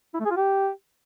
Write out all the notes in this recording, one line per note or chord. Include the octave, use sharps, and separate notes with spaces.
E4
A3
G#4
F4
G4